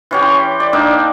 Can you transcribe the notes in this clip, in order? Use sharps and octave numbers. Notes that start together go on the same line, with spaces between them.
E3 C#4 G4
C6
D5
A#3 D4 D#4